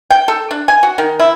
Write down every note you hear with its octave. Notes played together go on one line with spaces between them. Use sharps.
G5
A4
D4
G#5
F#4
D#3
E4